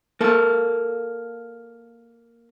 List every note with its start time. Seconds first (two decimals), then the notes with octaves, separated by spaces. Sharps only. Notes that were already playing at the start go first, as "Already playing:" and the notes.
0.21 A#3 A4